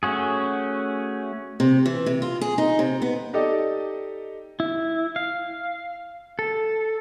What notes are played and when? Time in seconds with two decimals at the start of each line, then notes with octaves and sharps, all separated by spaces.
0.03 A3 C#4 F#4 G#4
1.60 C3
1.86 E3
2.06 C3
2.22 F4
2.41 G#4
2.58 D#4
2.79 C3
3.02 B3
3.33 D#4 G4 A4 D5 D#5
4.60 E4
5.16 F5
6.39 A4